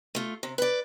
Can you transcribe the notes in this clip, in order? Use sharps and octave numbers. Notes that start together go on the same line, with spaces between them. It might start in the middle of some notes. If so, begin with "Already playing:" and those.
A3 F4
C3
B4 D5